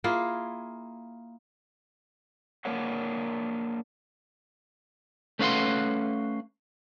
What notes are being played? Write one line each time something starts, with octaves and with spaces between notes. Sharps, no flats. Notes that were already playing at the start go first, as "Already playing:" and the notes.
A#3 E4 F4 G#4
A#3 D4 A#4 C#5 F#5
A3 C#4 B4 F5 F#5 C6